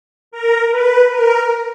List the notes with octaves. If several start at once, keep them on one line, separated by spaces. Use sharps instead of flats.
A#4
B4
A#4